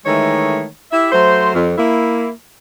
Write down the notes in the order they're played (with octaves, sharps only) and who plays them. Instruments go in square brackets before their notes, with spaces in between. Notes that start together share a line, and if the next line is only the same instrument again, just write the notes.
[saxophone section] D#3 E3 G#3 A3 C#5
E4 G4 E5
F#3 A3 C5
F2
A#3 E4